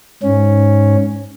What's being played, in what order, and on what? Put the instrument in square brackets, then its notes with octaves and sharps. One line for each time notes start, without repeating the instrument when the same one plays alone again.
[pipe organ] G#2 C#4